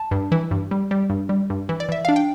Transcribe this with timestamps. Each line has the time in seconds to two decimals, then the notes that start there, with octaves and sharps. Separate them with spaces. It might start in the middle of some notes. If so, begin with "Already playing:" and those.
Already playing: A5
0.11 G2
0.32 E3
0.51 G2
0.71 G3
0.91 G3
1.10 G2
1.29 G3
1.50 G2
1.69 E3
1.80 D5
1.89 E3 E5
2.05 D4 F5
2.16 G5